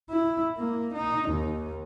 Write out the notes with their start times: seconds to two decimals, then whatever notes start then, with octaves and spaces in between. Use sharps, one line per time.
0.10 E4
0.58 A#3
0.94 D#4
1.29 D#2